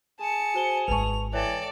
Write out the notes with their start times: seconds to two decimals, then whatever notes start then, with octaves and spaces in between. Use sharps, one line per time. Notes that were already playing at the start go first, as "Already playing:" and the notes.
0.20 G#4 A5 C#7
0.54 F#4 C5 G7
0.88 G#1 G#3 B4 A5 C#6 F7
1.33 E3 A4 C#5 D5 G5